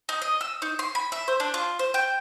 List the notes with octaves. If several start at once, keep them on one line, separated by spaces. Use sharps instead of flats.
D#4
D#5
E6
D#4
C6
B5
E5
C5
D4
F4
C5
G5